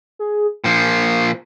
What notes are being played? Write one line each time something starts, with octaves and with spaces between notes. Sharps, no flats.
G#4
A#2 F3 C7